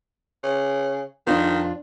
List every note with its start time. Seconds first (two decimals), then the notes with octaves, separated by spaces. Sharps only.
0.44 C#3
1.27 F2 D#3 D4 F4